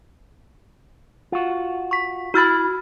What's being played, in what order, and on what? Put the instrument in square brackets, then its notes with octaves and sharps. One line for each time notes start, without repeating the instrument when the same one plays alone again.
[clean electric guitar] F4 F#4
[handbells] C#6 B6
[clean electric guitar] E4 B5 [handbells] F#4 F6 A6